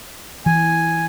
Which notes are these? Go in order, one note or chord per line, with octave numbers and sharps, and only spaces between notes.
E3 G#5